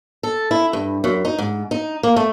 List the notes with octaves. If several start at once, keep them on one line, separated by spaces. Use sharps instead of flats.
A4
E4
G2
F#2
D#4
G#2
D#4
A#3
A3